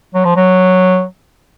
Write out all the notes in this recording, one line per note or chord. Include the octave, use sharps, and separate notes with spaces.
F#3
F3
F#3